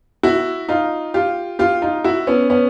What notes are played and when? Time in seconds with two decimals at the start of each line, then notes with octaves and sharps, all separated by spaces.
0.23 E4 F#4
0.69 D#4 F4
1.14 F4 G4
1.59 F4 G4
1.82 D#4 F4
2.04 E4 F#4
2.27 B3 C#4
2.50 B3 C#4